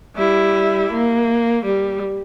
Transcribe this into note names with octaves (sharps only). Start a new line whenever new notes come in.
G3 E4
A#3
G3